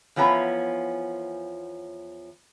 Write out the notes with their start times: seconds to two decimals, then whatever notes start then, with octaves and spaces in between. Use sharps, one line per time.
0.16 E2 F3 B3 C#4 A#5